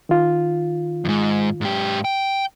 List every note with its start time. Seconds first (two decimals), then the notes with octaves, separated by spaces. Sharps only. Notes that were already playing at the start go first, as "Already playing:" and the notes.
0.09 D#3 F4
1.05 F2 G#2
1.61 G#2 G4
2.05 G5